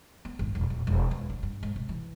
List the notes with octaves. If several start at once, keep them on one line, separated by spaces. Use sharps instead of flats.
B3
G#1
E1
D#1
E1
E2
D3
G2
G#2
C3
E3